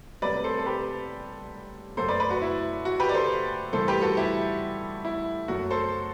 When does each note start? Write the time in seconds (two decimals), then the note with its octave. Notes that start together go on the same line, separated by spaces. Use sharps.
0.22 C2 C3 F#3 A3 B4 D5
0.44 A4 C5
0.59 A4
0.66 G4 B4
1.97 F#2 F#3 A3 A4 C5
2.08 B4 D5
2.20 B4 D5
2.31 F#4
2.42 E4
2.85 F#4
3.00 G4 B4
3.09 D5
3.14 A4 C5
3.73 G2 E3 A3 A4 C5
3.88 G4 B4
4.02 F#4 A4
4.17 E4 G4
5.05 E4
5.48 F#2 F#3 A3 F#4
5.70 A4 C5